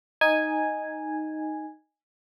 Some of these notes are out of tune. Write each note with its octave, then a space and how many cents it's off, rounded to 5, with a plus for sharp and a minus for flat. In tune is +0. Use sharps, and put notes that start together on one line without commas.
D#4 +0 G#5 -5